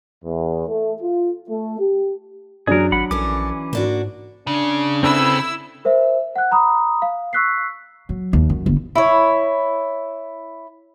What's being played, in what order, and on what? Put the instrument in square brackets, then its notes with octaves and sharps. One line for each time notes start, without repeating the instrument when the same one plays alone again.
[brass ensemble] E2
A3
F4
A3
G4
[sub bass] F#2 [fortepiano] F#3 D4 [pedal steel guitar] G#4 A#4
[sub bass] G#1 [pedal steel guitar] F#5 B5
[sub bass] A#1 [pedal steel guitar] E3 C#4 D6 [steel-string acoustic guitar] A4 A#4
[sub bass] G#2 [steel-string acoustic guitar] A#3 D4 F#4
[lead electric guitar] C#3 [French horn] D4
[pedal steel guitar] C4 A4 B4 [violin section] E4 E6
[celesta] A#4 C5 E5
F#5 F#6
A#5 B5 D#6
F5
C#6 E6 F#6 B6 C7
[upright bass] F#3
D#2
F#2
G1
[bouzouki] E4 C#5